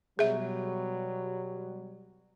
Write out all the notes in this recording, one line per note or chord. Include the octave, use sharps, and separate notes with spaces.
B2 F#3 G3 G#4 E5